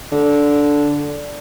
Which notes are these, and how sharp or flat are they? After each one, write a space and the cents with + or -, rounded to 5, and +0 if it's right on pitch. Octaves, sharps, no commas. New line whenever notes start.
D3 -10